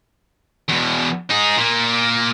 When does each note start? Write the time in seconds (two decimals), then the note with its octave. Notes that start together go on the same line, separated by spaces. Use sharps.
0.69 E2 B2
1.30 D#4 G#4
1.57 A#2 A#3